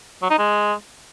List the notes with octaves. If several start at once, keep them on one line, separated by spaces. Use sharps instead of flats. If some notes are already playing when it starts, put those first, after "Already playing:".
F#3
D#4
G#3